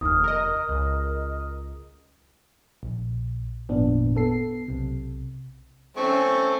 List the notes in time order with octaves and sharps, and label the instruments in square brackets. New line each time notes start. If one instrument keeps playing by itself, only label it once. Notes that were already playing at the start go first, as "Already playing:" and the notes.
[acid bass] F1 [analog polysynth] D#2 [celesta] D#6 F6
[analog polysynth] A#4 D#5
[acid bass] C#2
[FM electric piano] A#1
G#1 F2 A#2 B3 D4
B3 A4 C7
B1 C3
[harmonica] A3 C4 [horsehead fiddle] C#4 [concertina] C#6